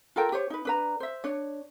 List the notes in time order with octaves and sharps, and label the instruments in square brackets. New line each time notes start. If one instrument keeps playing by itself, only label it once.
[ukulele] F4 A4 A#4 G5
G4 C5 C#5
D#4 B4
D4 B4 A#5
C5 E5
D4 C#5